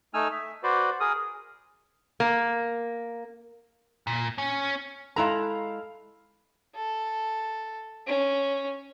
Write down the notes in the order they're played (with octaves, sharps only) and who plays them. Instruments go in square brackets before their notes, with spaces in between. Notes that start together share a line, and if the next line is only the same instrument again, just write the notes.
[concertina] A3 D#4 G#5 E6 F6
E5
F#4 B4 C5 D5
G#4 A#4 D#6
[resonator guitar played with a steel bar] A#3
[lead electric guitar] A#2
C#4
[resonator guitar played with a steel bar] G#3 E4 A#5 [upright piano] A4 F5
[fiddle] A4
C#4